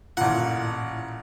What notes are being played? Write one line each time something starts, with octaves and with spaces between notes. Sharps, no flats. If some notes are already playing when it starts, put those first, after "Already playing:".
A1 A#2 F#5